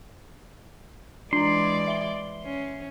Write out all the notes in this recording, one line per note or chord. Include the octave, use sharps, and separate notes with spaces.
E3 G#3 D4 D5 A#5 C6
E5 G7
C#4